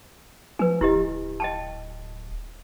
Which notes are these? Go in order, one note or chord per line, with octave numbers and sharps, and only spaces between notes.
F3 B4 G#5
D1 E4 G4 D#5
D#5 G5 A5